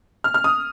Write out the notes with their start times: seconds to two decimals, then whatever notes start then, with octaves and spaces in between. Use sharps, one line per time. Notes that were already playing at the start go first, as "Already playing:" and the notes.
0.24 F6
0.34 F6
0.44 D#6